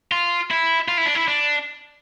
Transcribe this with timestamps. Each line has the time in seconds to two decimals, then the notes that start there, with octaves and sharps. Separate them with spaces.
0.12 F4
0.50 E4
0.88 F4
0.97 E4
1.06 D4
1.15 E4
1.28 D4